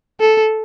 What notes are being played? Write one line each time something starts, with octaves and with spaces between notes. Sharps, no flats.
A4